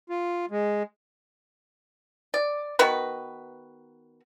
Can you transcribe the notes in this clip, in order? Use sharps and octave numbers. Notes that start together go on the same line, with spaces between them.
F4
G#3
D5
D#3 B3 F#4 B4